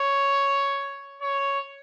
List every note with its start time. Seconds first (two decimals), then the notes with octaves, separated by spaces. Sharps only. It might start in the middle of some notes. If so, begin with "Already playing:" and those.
Already playing: C#5
1.22 C#5